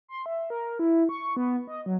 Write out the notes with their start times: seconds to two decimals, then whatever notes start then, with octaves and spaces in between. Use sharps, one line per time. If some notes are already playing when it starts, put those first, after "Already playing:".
0.08 C6
0.26 E5
0.50 A#4
0.79 E4
1.09 C#6
1.37 B3
1.67 D#5
1.86 F#3